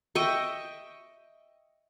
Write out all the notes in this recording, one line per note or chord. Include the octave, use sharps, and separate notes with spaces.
D#5 E5 G5 C#6